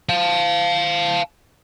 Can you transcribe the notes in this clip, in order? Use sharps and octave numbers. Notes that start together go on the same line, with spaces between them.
F5 A5